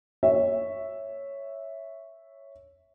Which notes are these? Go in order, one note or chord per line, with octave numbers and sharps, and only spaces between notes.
C#5 E5